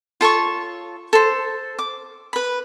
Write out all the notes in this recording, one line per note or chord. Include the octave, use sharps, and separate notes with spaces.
F4 A4 C#5 C#6
A4 C5
D6
B4 B5